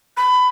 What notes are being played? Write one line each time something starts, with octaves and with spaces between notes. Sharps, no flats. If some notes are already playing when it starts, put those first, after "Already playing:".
B5